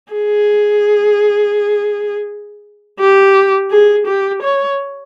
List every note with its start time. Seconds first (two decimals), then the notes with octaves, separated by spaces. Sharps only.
0.13 G#4
2.99 G4
3.71 G#4
4.07 G4
4.42 C#5